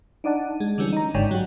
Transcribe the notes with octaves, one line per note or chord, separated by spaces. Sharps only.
D4 D#4 D5 F#5 A5
G#3
D3 E3 G3 C#4
D#4 A#5
G1 G#2 D3 C#5 D5 G5
F#3 F#4